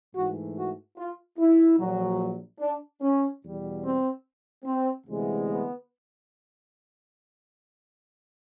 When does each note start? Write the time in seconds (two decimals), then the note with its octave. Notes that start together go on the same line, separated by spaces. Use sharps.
0.15 G#2 E3 A3 F#4
0.56 F#4
0.98 F4
1.39 E4
1.79 A#1 A#2 F#3
2.60 D4
3.02 C#4
3.42 E2 B2 G3
3.84 C4
4.65 C4
5.07 D2 C3 E3 G#3 B3
5.47 B3